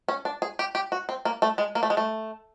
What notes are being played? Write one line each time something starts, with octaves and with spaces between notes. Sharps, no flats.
C#4
D4
G#4
G4
G4
F#4
C4
A#3
A3
G#3
A#3
A3
G#3
A3